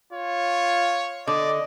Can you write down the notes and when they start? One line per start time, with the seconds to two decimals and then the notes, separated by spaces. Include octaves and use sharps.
0.13 F4 C#5
1.27 D3 D5 D#5